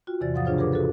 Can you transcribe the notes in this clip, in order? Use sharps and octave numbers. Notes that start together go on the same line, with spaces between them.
F4 F#4 G5
E2 C3 E3 D5 A6
G#2 F3 F5 F#5 D#6 A6
C#3 D4 F4 G#4 C5 C#5
G4 G#4 A#4 B4 D6
F#4 G#4 A4 B4